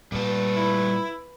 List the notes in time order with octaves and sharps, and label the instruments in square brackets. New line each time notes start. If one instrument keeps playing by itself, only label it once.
[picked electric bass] A#2 [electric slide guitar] G3 A3 A5 [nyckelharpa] B4
[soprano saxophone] E4